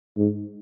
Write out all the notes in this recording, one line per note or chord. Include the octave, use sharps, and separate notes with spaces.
G#2